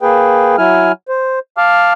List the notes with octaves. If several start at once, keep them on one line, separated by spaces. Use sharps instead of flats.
A#3 G#4 B4 G5
F#3 E4 G#5 F6
C5
F5 A5 D6 F6